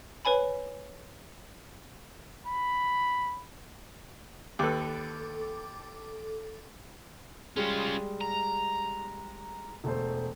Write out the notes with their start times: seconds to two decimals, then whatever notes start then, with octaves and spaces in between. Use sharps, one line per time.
0.25 B4 C#5 G#5 B5
2.47 B5
4.59 D#2 A4 B4 D6
7.57 G3 G#3 C#4 F4
8.21 A#5
9.84 E1 A3 C5